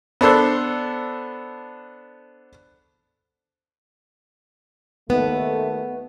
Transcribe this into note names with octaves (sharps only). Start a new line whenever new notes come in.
B3 D4 A4 C5
D#2 A3 B3